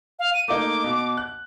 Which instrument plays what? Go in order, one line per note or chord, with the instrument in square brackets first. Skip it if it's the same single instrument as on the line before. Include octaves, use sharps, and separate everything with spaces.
[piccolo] F5
D#7
[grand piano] A3 A#3 D#4 [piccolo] D6
[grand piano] B2
F#6